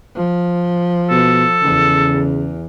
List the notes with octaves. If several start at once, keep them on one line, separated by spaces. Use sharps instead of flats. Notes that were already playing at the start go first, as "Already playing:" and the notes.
F3
B2 A4
E2 C#3